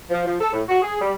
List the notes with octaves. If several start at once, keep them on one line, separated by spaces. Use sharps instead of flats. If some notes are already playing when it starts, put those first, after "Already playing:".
F3
F3
A4
A2
F#4
G#4
G3